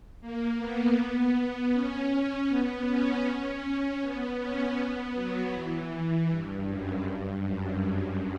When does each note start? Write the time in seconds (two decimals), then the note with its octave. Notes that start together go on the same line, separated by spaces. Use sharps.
0.21 A#3
0.59 B3
1.73 C#4
2.48 B3
2.87 C#4
3.25 C#4
3.63 C#4
4.01 B3
4.39 C#4
4.77 B3
5.15 F#3
5.54 E3
6.29 G2
6.68 F#2
7.05 G2
7.43 F#2